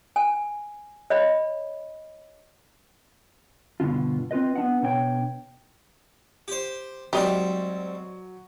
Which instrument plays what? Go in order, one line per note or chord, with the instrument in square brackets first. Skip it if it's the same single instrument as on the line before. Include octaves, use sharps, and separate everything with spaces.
[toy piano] G#5
C#5 D#5 B5
[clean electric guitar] G2 B2 D3 F4
C4 F4 B4 D#5
B3 D4 F#5
B2 D4 C#5 G5
[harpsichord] G4 C5
[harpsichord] G#2 G3 C4 [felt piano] F#3 [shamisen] G4 D#5